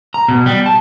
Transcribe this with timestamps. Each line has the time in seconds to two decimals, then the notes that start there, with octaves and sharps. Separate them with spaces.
0.14 A#5
0.28 B2
0.46 G3
0.66 A5